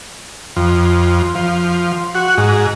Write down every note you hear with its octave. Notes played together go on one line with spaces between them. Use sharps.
F2
F3
F#4
G#2